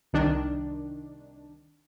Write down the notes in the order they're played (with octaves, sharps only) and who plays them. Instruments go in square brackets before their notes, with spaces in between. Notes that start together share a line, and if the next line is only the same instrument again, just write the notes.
[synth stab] C2 D#3 D4